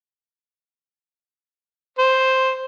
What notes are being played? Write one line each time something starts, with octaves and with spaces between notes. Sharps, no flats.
C5